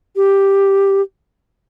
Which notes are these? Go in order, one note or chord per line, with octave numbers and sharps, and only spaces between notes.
G4